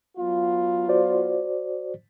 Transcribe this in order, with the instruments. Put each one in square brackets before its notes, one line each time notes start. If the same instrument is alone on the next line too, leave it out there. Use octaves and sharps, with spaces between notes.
[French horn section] F#3 B3 F4
[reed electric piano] F#4 C5 D5